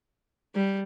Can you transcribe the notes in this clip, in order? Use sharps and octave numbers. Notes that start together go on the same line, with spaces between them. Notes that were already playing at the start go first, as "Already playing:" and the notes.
G3